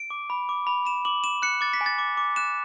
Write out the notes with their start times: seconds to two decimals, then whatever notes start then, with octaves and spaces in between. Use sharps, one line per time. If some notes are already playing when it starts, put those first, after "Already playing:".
Already playing: D7
0.10 D6
0.30 B5
0.49 D6
0.67 B5
0.85 B5 E7
1.05 D6 F#7
1.24 D6 E7
1.42 F#6 C#7
1.61 D6 A6
1.73 B6
1.81 G#5
1.86 A6
1.98 D6
2.17 D6
2.36 F#6 E7